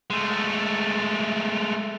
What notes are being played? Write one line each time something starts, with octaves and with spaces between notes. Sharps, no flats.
G#3 A3